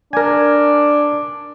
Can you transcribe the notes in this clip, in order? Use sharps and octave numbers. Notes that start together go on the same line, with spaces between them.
D4 A#4 G#5